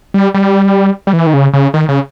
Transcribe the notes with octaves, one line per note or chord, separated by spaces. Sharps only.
G3
G3
G3
E3
D#3
C#3
C#3
D#3
C#3